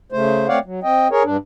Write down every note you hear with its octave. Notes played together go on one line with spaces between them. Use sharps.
C#3 A3 C5
A3 C4 C#5 D5 F5 F#5
F#3
C4 D#5 G5
G#4 A#4 C#5
G2 D4